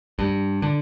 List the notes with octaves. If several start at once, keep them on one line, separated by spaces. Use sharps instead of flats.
G2
D3